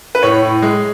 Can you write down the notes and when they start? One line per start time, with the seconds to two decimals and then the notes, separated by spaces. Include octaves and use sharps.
0.15 B4
0.23 A2 C#5
0.42 A2
0.62 G#3